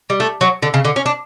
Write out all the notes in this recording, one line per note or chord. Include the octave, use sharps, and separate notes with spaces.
G3
A3
F#3
D3
C#3
D3
C#4
D4